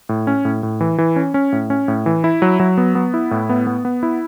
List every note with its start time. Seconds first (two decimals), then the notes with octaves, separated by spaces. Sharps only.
0.09 A2
0.27 C#4
0.45 A2
0.63 A2
0.81 E3
0.98 E3
1.16 C#4
1.34 C#4
1.52 A2
1.70 C#4
1.88 A2
2.06 E3
2.24 E4
2.42 F#3
2.60 F#3
2.78 B3
2.95 B3
3.14 E4
3.31 A2
3.49 B3
3.67 B3
3.85 B3
4.03 E4